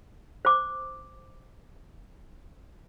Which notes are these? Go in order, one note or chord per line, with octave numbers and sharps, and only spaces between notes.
C5 D6